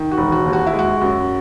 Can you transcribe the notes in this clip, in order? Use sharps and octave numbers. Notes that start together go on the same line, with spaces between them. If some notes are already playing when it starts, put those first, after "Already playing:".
Already playing: D#3
F#4
E1
F#4
D#2
F#4
E4
G#3
F#4
F#2